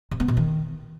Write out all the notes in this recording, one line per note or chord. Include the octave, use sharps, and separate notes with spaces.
C3
B3
B2
D#3